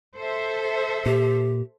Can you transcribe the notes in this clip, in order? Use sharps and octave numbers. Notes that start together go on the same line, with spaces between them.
A4 C5 E5
A#2 G4